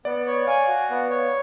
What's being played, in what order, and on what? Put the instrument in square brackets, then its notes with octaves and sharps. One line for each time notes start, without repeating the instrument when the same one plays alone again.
[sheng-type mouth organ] B3 [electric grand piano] D5
[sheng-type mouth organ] C#5
[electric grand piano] F5 [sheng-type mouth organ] G#5
[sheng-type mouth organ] F#4
B3
C#5